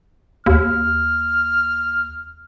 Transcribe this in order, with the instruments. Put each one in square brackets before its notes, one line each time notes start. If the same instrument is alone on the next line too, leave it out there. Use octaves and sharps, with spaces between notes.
[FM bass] D#2 [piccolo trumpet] F6